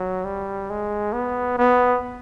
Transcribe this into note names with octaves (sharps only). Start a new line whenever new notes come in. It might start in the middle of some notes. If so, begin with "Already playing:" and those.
Already playing: F#3
G3
G#3
B3
B3